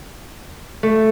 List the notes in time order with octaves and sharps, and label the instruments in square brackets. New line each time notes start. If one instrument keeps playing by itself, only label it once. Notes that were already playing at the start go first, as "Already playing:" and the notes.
[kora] A3